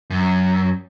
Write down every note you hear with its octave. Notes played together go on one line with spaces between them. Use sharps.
F#2